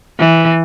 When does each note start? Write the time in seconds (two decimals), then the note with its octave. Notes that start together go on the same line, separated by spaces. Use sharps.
0.19 E3